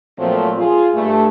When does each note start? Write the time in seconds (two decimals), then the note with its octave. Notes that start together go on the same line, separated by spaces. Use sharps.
0.18 A#2 F3 F#3 A3 C4
0.57 F4 G#4
0.93 G2 A3